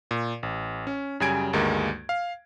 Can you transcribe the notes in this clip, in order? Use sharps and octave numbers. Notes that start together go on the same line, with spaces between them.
A#2
A1
C#4
F#2 C#3 G3 G#5 G#6 D7
D2 G2 D#3 G#3 A#3
F5